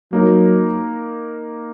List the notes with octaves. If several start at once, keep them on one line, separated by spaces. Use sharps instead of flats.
F#3 A#3 D#4 A#4